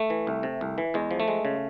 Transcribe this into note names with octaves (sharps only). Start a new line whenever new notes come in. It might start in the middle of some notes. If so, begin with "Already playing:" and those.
Already playing: A3
E3
C2
C3
C2
E3
E2 G#3
F3
A3
G#3
C#3